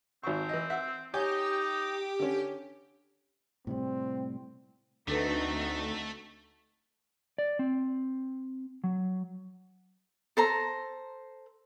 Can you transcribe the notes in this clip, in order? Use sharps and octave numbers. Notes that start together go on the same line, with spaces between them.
G#1 C4 C#6
E3 D#5
E5 F#5
D#4 G4 C#5 G#5
D3 C#4
A2 C3 G3 C4
D2 A3 C4 D4 D#4 F#4 A4 B4
D5
C4
F#3
A4 C5 A#5